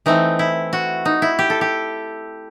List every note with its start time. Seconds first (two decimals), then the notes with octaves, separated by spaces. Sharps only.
0.06 E3 A3 C4 D#4
0.39 E4
0.73 F#4
1.05 D#4
1.22 E4
1.39 G4
1.50 A4
1.61 G4